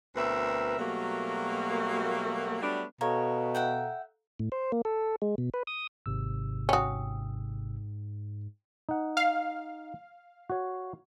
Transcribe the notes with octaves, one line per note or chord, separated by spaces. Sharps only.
D2 B2 C4 A#4 B4 E5
B2 F#3 G3 A3 A#3
F#3 G3 A3 B3 D4
B2 A4 C#5 F5 A#5
E5 F#5 G5
A2
C5
A#3
A4
G#3
B2
B4
D#6
G#1 G#2 C3 E6
C#4 F#4 G5 D#6
D#4 F#5
F5
F#4 C#5